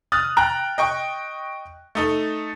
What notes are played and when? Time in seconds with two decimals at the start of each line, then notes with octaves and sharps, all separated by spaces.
0.12 D#6 F6 F#6 A6
0.37 G5 A#5 F#6
0.78 D#5 G5 C#6
1.95 A3 D#4 A4